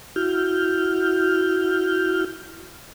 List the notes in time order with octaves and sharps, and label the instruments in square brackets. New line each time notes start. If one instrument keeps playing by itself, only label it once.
[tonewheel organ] E4 F#4 F6 G6